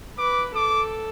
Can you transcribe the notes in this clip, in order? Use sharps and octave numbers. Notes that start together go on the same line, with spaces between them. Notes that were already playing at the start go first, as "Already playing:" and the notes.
B4 D6
A4 D6